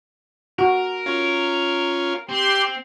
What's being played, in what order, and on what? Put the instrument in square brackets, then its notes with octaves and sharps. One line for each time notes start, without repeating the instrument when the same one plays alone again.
[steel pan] F#4 [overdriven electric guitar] A#4
[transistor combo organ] C#4 F4
[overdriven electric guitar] C4 [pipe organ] G4 C6